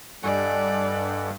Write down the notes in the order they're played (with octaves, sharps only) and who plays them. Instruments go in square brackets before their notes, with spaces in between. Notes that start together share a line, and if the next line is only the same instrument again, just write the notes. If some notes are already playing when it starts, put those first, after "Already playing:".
[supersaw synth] G2 [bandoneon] A4 F#5 [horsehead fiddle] D5 [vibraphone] D#5 G#5